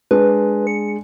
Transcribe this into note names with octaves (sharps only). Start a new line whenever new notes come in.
G#3 D4 B4
C#7